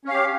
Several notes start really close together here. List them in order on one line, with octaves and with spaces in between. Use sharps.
C#4 F5 G4